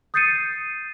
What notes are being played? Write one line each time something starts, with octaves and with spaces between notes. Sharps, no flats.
D#6 G6 A6 C7 C#7 D#7